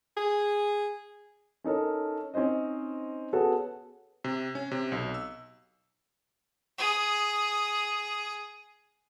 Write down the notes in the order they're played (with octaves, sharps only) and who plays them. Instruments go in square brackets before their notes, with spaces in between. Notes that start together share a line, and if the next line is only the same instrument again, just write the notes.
[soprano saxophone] G#4
[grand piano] C#4 D#4 A4 A#4 C#5
C4 C#4 D#4 C5 D#5
B3 F#4 G#4 A4 B4 C#5
[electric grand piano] C3
C#4
C3
B1
E6
[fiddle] G#4 D#6